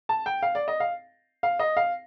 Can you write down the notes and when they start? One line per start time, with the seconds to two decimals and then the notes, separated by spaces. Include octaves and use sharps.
0.09 A5
0.26 G5
0.42 F5
0.55 D5
0.68 D#5
0.80 F5
1.43 F5
1.59 D#5
1.77 F5